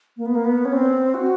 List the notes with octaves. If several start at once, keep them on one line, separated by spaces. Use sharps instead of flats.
A#3
B3
A#3
B3
C#4
C4
F#4